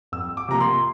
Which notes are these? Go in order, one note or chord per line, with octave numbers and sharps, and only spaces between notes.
F2 E6
D6
C3 F3 A#3 A#5
C6